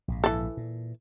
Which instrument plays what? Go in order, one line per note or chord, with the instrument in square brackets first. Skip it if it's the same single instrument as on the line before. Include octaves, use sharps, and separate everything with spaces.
[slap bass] A#1 G#2
[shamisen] E3 A4
[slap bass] A#2